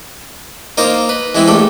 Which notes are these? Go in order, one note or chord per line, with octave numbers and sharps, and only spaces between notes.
A#3 D#4 F4 A#4 C5
B4
E3 G#3 C4 E4
A#1 A3 G4